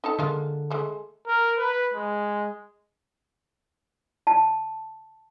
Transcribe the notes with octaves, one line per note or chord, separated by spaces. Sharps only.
D#4 A4 A5
D3 G#3 A#3 F4
G#3 A3
A#4
B4
G#3
A5